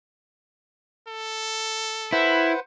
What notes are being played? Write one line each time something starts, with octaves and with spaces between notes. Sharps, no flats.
A4
E4 B4 C5 F#5